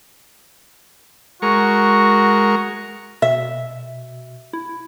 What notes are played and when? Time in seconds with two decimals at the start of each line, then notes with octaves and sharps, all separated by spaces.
1.42 G#3 F#4 A#4 C#6
3.22 B2 E5
4.53 E4